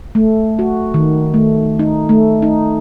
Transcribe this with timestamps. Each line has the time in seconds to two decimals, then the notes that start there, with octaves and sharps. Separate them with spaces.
0.15 A3
0.59 F#4
0.94 D#3
1.34 A3
1.79 D#4
2.09 A3
2.42 D#4